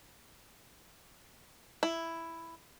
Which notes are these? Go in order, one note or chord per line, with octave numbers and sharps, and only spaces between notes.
E4